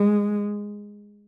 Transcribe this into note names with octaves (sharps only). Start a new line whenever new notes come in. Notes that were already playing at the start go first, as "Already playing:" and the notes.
Already playing: G#3